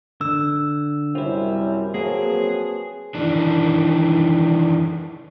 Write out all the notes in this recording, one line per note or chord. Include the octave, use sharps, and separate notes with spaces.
D3 E6
F#2 C3 G3 E4 F4
F3 F#3 A#3 C4 G#4 B4
D#3 E3 D4